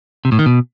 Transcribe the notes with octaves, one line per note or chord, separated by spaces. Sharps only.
C3
A2
D#3
B2